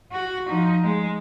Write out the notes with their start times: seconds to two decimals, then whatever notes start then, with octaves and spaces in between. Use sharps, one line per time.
0.12 F#4
0.49 F3 D#4
0.83 G#3